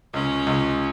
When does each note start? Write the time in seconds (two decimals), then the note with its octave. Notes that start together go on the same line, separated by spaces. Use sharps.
0.14 C#2 C#4
0.47 C#2